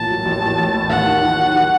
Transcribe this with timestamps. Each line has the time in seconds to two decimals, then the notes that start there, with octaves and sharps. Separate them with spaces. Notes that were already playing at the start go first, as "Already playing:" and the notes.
Already playing: A1 A#2 A5
0.09 F#3
0.26 A1
0.42 A1
0.58 A1
0.74 A2
0.90 D#2 F#5
1.06 D#3
1.22 D#3
1.38 F#3
1.54 D#3